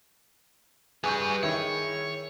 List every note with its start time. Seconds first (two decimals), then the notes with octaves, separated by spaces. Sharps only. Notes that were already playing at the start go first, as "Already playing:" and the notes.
1.04 G3 G#4 B4 G#5 C#6 G6
1.43 D#3 E4 C#5